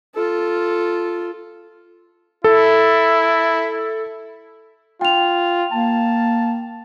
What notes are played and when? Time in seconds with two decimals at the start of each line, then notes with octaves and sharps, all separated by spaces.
0.14 F4 A4
2.44 E4 A4
5.01 F4 G5 F7
5.72 A#3 A5